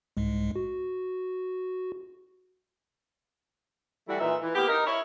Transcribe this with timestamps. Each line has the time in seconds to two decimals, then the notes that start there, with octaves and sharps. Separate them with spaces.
0.17 C2 G#2 G#3
0.56 F#4
4.08 E3 G3 A3 E4 F#4
4.20 A#2 E3 D#4 E5
4.41 E3
4.55 A#3 B3 G4
4.68 D#4 A#4
4.86 E4 C#5